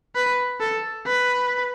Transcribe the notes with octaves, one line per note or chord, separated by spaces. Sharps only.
B4
A4
B4